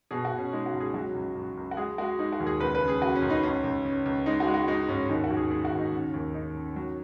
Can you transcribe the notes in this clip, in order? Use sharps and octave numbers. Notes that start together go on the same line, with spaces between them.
B2 G#4
F#4
B2
C#4
G#3 D#4
F#4
C#2
G#4
F#3 F#4
C#2
C#2
C#2
F#4
G#3 G#4
G#3 F#4
G#3 D#4
F#4
D#2
G#4
C#2 B4
B4
C#3
G#4
C#3 F#4
C#4
C#2
D#4
C#2 C#4
C#2
C#3
C#2
G#3 D#4
F#4
G#3
F#4
G#3 D#4
G#2 C#4
D#2 D#4
F#4
D#2
G#4
G#3 G#4
F#4
D#2
D#4
C#3
D#2
C#3 D#4
C#3
F#3